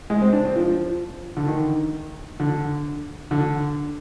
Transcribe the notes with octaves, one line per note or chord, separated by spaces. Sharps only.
G#3
C4
D4
C4
F3
D3
D#3
D3
D3